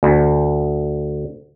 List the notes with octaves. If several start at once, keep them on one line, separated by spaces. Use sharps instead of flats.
D2